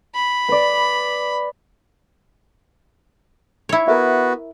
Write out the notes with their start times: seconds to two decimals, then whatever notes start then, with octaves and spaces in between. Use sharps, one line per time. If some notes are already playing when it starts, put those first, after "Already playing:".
0.15 B5
0.49 B4 D5
3.69 E4 C#5
3.88 B3 F#4 A#4 E5